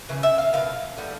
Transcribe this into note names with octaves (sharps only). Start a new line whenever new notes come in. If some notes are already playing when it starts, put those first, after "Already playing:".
C#3 E3
E5
F5
B2 G3 B3 F5
D3 G3 B3